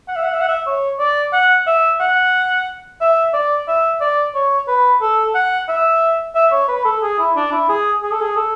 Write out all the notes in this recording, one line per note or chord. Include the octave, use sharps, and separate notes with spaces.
F#5
E5
F#5
E5
F#5
E5
C#5
D5
F#5
E5
F#5
E5
D5
E5
D5
C#5
B4
A4
F#5
E5
E5
C#5
B4
A4
G#4
E4
D4
E4
G#4
G#4
A4
G#4
A4